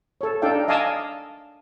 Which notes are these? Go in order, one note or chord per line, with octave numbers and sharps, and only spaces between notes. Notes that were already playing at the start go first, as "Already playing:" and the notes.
A4 C#5
D4 D#4 A4 D5 F5 G5
D#5 F5 G#5 A5 D6 E6